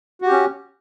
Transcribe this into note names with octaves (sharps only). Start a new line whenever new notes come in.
C#4 F#4 G4